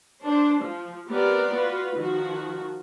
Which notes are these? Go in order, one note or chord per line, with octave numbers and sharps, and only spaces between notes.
D4 C5
F3
B3 C4 G4 A#4 D5
F4 F#4 B4
D#3 F3 F#4